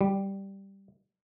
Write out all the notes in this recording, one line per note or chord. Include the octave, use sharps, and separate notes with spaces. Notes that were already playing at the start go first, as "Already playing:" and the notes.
G3